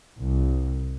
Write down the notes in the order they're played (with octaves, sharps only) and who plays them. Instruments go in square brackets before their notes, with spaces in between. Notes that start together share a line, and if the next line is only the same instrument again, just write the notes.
[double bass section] C2